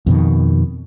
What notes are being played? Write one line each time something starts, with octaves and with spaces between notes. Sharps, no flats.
F2 B2 D#3